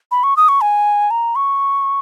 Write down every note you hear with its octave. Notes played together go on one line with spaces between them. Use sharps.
B5
C#6
D#6
C#6
G#5
A#5
C#6